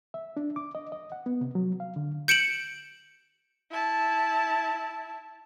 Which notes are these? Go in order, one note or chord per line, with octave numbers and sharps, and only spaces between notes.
E5
D4
D6
D#5
D#5
F#5
B3
C3
F#3
F5
D3
G6 C#7 D7 E7 F#7
E4 A5